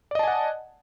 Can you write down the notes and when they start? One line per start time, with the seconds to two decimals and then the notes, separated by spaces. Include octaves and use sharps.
0.11 D5
0.15 D#5
0.19 A5
0.23 G#5
0.28 F#5